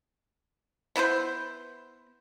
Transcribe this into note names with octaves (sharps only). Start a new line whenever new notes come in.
B3 E4 B4 C5